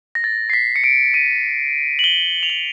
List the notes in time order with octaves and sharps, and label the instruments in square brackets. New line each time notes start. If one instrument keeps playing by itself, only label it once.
[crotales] A#6
A6
C7
B6
C#7
D7
D#7
F#7
G7
F7
F#7